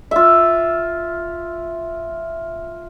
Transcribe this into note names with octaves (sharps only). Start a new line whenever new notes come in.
F4 E5